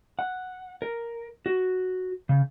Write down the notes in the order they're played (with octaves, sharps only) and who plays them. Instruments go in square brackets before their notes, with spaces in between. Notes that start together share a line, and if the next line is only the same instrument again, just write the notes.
[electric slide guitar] F#5
A#4
F#4
C#3